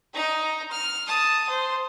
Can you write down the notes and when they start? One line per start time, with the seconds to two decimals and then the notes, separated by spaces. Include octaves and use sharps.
0.14 D#4 A#5
0.71 F6
1.07 A5 D#6
1.49 C5